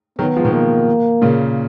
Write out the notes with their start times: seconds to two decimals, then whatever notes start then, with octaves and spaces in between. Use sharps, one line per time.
0.19 D#3 F#3 B3
0.36 F3 G#3
0.45 B2 D#3
0.53 A#3
1.22 A#2 C#3